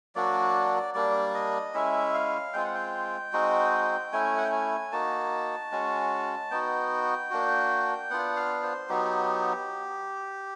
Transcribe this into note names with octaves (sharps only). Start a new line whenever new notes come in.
F#3 A#3 D4 F#4 D5
G3 A#3 D4 D5
D#5
G#3 C#4 E4 E5
F5
G#3 C4 F4 G5
F#5
G5
G#3 C4 D#4 F#4
A3 C#4 E4 G#5
F#5
G5
G#5
A#3 D#4 F#4 A5
G#3 C#4 F#4
B3 D#4 F#4 G5
A#3 D4 F#4
B3 D4 F4 F#5
F5
C5
F#3 B3 D#4 G4